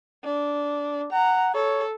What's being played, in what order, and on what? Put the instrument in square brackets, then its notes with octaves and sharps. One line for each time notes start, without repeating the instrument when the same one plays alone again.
[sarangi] D4
[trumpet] F#5 [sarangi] A#5
[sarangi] A4 [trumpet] C#5